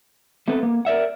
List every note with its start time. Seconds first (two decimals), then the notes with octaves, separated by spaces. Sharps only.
0.48 A3 B3 C4 A4 B4
0.63 A#3
0.85 A#4 D5 E5 F#5